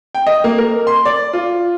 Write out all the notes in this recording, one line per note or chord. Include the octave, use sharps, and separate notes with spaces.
G5
D#5
A#3
A#4
C6
D5
F4